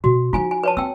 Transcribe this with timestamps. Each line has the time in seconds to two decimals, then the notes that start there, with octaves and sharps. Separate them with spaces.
0.04 B2 F#4
0.33 F3 D#4 F4 G#5
0.51 G#5
0.64 B4 C#5 A5
0.77 C4 G5 E6